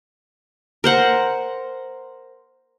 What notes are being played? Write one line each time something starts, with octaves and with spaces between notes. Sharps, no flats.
A#4 C5 F#5